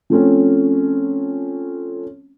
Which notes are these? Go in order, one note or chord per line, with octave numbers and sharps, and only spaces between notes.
F3 A3 C4 C#4